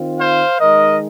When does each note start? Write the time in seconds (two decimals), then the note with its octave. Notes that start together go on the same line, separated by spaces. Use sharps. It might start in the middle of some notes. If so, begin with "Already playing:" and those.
Already playing: D#3 C4 F4
0.19 C5 F5
0.60 D#3 G#3 D#4 A#4 D#5